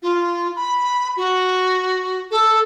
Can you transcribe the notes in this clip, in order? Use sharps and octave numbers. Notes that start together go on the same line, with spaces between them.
F4
B5
F#4
A4